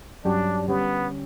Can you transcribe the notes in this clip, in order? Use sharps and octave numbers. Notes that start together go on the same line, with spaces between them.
G2 F#3 C#4 D4 G4
D3 G3 B3 C#4 G4